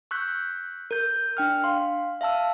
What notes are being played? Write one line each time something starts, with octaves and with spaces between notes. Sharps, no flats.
C#6 E6 F#6 G6 B6
A#4 G6
D4 G5 F6
F5 C6
E5 F5 A5 E6